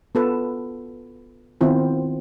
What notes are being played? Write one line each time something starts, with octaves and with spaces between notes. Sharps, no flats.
B3 F4 A4 B4
D#3 B3 C4 E4 F4